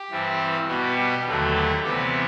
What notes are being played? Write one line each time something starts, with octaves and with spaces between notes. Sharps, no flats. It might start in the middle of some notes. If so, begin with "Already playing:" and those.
Already playing: G4
G2 E3 G3 C4
B2 G3 B3 F#4
G4
D#2 D3 F#3 A3 F#4
G4
C3 E3 G3 B3 G4